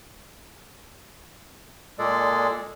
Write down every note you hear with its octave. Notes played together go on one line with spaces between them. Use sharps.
A#2 G#3 G#4 A4 D5